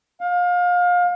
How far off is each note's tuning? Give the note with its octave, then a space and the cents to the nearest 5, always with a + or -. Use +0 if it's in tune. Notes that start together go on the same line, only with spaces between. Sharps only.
F5 +30